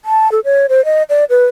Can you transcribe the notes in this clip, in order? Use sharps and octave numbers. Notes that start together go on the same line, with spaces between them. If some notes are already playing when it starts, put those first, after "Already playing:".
A5
A4
C#5
C5
D#5
D5
B4